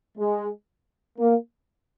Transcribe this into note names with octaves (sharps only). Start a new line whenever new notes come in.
G#3
A#3